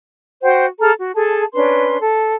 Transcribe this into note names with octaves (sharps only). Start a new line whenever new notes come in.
F#4 C5 F#5 G5
G#4 A4 A#5 F6
F#4
G#4 A4 A5
C#4 D4 B4 C6
A4